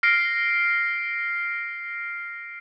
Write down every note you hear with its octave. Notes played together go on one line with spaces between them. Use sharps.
F6 A#6 C7 D7